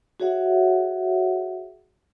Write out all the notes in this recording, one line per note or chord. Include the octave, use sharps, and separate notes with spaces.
F#4 G#4 C#5 E5 F#5